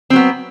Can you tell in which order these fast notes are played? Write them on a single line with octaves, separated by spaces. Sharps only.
C4 F#3 B3